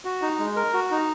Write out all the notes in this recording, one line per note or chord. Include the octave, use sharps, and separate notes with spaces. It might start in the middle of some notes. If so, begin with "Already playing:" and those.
F#4
D#4
G#3
A#4
F#4
D#4